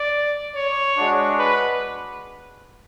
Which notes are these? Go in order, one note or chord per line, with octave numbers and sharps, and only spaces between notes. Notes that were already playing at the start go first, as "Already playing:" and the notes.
Already playing: D5
C#5
G#3 D4 F#4
B4